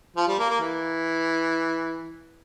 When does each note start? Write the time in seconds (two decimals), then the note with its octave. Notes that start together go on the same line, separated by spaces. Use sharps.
0.16 F3
0.27 G3
0.39 A#3
0.49 A#3
0.60 E3